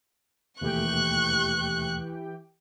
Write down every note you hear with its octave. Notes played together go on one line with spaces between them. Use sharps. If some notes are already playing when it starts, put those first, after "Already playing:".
D#2 B2 E3 A3 G4 G5 C#6 F#6